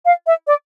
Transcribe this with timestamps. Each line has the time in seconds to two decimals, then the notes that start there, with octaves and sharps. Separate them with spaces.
0.05 F5
0.27 E5
0.47 D5